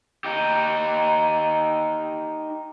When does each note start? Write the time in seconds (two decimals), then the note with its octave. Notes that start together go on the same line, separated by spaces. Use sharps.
0.24 D#4 G4